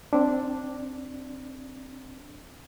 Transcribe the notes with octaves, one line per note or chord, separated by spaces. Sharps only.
C4 D4